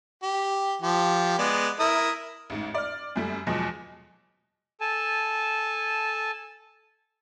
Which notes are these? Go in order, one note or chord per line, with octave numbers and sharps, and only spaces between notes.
G4
F3 G4
G#3 B3 D5
E4 A#4 D#6
A1 G#2
D5 F6
F#2 G3 A3
E2 B2 F3 F#3 G#3
A4 G#5 A5